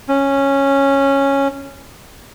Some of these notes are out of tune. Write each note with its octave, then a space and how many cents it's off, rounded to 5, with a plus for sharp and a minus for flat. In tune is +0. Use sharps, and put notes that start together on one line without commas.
C#4 -10